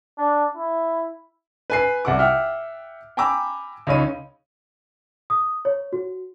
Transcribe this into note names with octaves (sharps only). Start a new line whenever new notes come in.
D4
E4
B4 G#5 C7
C2 F#5 D6
E5 F#5 G5 F6
G5 G#5 A#5 B5 D6 E6
C#2 D#4 C#5 B5 D#7
D#6
C#5
F#4